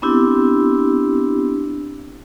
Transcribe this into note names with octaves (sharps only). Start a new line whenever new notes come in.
B3 C4 D4 E4 G4